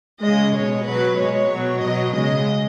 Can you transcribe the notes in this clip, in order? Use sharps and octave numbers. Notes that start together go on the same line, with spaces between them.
C#3 G#3 D#5
B2 G#3 C#5
B2 F#3 B4
B2 G#3 C#5
B2 F#3
B2 F#3 D#5
C#3 G#3 D#5